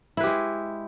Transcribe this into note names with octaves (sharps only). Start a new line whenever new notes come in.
G#3 E4 G4 B4